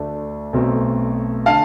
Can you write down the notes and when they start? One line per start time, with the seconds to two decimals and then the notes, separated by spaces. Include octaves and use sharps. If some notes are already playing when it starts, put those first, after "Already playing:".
Already playing: D2 D3 A3 D4
0.53 B1 B2 A3 C4
1.46 D3 F5 A5